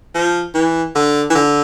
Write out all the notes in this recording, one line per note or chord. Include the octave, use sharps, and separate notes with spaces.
F3
E3
D3
E3
D3